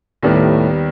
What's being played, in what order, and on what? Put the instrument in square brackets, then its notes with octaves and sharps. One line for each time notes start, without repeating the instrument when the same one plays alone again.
[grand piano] D#2 D#3 G3 B3 [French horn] A2